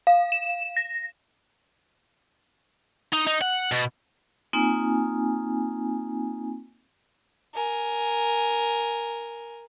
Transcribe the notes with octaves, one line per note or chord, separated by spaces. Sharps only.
F5
E7
A#6
D#4
D#4
F#5
B2
A#3 C4 D#4 F4 G#5
A#4 G#5